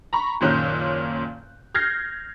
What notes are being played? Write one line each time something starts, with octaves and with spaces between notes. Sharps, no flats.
A#5 B5 C#6
F#1 A#2 D#3 C#4 F#6 G6
F6 G6 G#6 A#6 C7